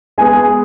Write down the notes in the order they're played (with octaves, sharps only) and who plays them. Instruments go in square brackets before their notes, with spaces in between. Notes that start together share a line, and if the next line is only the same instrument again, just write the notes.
[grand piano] G#3 B3 G#4 [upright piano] G#5